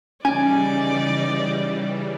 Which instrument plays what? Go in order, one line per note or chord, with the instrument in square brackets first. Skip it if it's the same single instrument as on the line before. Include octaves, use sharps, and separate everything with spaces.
[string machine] C#3 E3 G3 [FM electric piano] C#4 [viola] D#4 D5 [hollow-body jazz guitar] G#5